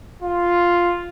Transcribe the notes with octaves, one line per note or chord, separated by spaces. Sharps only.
F4